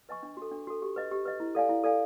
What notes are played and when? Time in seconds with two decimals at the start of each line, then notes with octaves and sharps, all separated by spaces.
0.09 B4 D#5 G#5 C#6
0.23 D4
0.37 F#4 A4
0.52 D4
0.67 F#4 A4
0.82 G4
0.96 B4 D#5
1.11 G4
1.25 B4 D#5
1.40 E4
1.55 A4 D5 F5 G#5
1.69 E4
1.84 A4 D5 F5 G#5